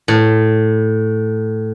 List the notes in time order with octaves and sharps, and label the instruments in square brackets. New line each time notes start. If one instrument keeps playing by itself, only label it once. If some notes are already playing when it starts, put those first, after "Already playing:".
[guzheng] A2